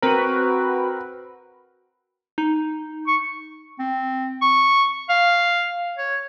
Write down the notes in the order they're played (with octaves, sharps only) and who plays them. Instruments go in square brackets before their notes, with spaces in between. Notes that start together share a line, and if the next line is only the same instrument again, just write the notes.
[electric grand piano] C4 A#4 [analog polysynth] F#4 B4
[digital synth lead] D#4
[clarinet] C#6
C4
C#6
F5
C#5